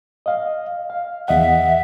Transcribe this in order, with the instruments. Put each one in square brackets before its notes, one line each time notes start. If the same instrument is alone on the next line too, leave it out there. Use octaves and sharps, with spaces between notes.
[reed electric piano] D#5 F5
F5
[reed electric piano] E2 D#5 F#5 [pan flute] E5